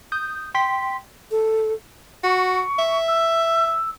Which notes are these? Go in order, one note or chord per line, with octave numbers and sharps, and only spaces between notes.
D#6 G6
G5 C6 B6
A4
F#4 C#6
E5
E6